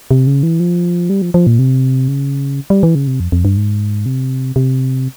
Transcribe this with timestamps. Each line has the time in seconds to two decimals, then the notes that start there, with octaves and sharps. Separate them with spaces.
0.11 C3
0.27 C#3
0.43 E3
0.60 F3
1.10 G3
1.22 F3
1.34 F3
1.47 A#2
1.59 C3
2.08 C#3
2.70 G3
2.83 E3
2.95 C#3
3.07 C3
3.20 F2
3.32 F2
3.45 G2
3.57 G#2
4.06 C3
4.56 C3